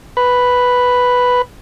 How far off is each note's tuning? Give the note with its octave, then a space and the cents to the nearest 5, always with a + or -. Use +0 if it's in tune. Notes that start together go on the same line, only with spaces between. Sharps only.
B4 +0